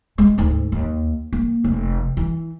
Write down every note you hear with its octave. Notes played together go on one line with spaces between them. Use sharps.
G#3
D2 G#2
D#2
A#3
F1
E3